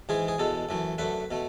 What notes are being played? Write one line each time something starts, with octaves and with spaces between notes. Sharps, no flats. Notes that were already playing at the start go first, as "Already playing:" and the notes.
G#2 E3 G#3 G#4
G#4
E2 B2 G#3 A4
F#2 E3 A3
F#2 D3 A3 B4
B2 A3